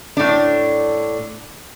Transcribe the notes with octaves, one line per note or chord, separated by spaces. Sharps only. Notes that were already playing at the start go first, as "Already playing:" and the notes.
A2 D4